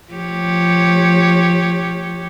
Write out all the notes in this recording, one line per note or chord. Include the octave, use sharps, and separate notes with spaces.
F3 G4 C#5